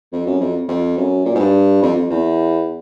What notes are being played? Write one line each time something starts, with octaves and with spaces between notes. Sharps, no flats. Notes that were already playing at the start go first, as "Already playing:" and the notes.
F2
F#2
F2
F2
F#2
A#2
G#2
G2
F2
F2
E2